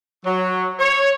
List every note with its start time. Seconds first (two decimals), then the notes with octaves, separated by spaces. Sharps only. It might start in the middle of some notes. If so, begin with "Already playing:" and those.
0.25 F#3
0.79 C#5